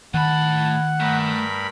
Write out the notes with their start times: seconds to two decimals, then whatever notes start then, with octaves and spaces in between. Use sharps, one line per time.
0.14 A2 D#3 F#5 A5 B5
1.00 G2 A3 A#4 B5